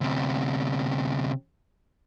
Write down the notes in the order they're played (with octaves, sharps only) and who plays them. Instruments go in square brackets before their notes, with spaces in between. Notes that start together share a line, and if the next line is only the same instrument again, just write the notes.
[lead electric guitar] D2 C3